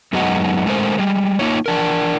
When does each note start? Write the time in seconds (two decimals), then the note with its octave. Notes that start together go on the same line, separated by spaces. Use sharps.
0.13 F#2 F#3 G#3 B3 D#4 F#4
0.66 F#3 G#3 A3 A#4 C5
0.98 G3 G#3
1.39 A#3 D#4 F4 C#5
1.66 E3 D4 A#4